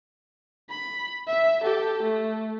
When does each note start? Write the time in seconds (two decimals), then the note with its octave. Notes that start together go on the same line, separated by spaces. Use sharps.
0.70 B5
1.28 E5
1.63 G4 A4
2.03 A3